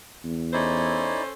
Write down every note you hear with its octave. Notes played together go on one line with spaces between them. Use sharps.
E2
C#4 D#4 E4 A4 C5 D5